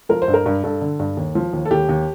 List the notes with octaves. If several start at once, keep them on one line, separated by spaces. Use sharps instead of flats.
F3 A#4
C5
G2
A#4
G2
G2 A4
D3
G2
D#2
F3
D#2
A4
D#2 G4
D#2